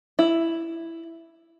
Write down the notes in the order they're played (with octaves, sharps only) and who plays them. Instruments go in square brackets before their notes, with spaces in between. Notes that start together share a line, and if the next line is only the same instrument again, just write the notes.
[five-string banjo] E4